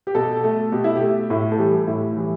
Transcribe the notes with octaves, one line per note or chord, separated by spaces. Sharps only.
G4
B2 A4
A3
B2 G4
E4
G4
A3
A2 E4
A4
E3 G3 G4
A2 E4
E3 G3